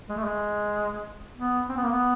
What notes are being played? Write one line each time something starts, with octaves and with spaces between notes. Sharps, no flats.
G#3
A3
G#3
B3
C4
B3
A#3
B3